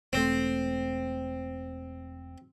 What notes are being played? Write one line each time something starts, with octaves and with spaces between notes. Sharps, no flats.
E1 A3 C4